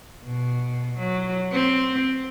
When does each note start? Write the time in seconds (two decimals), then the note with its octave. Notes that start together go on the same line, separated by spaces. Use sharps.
0.24 B2
0.98 F#3
1.52 C4